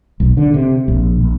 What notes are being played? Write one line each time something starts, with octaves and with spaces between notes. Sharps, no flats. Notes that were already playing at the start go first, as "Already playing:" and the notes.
B1
D3
C3
A#1
A#1